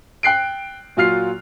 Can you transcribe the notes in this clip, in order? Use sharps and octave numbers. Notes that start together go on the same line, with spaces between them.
G5 F#6 C7 D7
A#2 F#3 F4 F6 C7